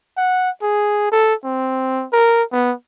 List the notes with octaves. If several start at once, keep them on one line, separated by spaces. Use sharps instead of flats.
F#5
G#4
A4
C4
A#4
B3